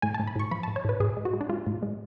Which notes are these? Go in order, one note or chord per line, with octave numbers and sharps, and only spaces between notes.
A2 G#5
A5
A2
B5
A2 C#6
F3 B5
A5
A2
C#5
A2 B4
A2 G#4
G#3
F#4
G#3
D4
G#3 F4
A2
G#3